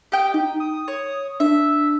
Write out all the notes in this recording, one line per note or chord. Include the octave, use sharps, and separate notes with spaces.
G4 D#5 G5
D#4 G5
D#6
C#5
D4 E5